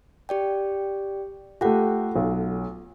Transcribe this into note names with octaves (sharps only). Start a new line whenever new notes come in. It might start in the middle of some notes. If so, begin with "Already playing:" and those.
G4 D5 G5
A3 F4 G4 A4 F#5
B1